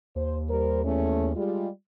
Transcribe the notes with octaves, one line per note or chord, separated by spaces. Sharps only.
D#2 C5
G3 A#4 C5
E2 A3 C#4
G3 G#3 F4